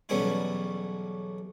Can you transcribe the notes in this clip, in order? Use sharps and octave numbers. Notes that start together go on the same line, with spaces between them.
B1 E2 G3 B3 C#4 E4